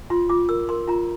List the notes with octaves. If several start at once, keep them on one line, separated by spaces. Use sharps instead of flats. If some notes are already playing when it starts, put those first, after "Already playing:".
F4 C6
F4 D6
A#4 E6
A#4 C6
F4 A#5